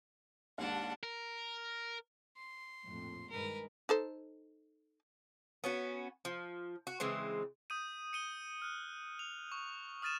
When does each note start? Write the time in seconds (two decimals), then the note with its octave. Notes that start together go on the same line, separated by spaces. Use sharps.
0.58 D#2 G#2 D4 F#5
1.03 A#4
2.37 C6
2.84 A#1 F2 A2
3.30 G2 D#3 G#3 A#4 B4
3.89 D#4 A4 C5
5.64 B3 C#4 F#4
6.25 F3
6.87 F#4
7.00 C#3 E3 G#3 C4
7.70 D#6 G6 D#7
8.13 C#7 D#7 G7
8.62 F6 F#6
9.19 F7
9.52 C#6
10.02 D#6 F6 A6 D#7 E7